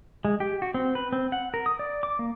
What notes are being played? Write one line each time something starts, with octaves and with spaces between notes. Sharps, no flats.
G#3
G4
F#4
C4
B4
C4
F#5
A#4
D#6
D5
D6
A#3